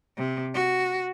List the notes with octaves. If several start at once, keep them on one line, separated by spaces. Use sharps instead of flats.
C3
F#4